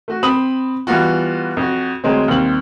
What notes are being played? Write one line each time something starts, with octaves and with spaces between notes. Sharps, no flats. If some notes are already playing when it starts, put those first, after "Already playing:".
A3 F#4
C4 B5 D#6 F#7
E3 G3 B3 F4 F#4
F2 F#4
D2 F#3 G#3 C4
D#2 G3 C4 F#7